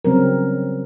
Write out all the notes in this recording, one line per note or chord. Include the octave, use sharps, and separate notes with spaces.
C#3 F#3 G3 C4 C#4 A#4